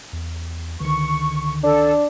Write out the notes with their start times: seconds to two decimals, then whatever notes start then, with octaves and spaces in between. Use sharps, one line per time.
0.13 E2
0.80 C#2 D3 D#3 C#6
1.64 D4 A4